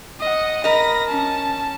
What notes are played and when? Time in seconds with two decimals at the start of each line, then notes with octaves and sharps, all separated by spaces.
0.20 D#5 F#5
0.64 A#4 D#5 B5 A#6
1.07 C#4 A5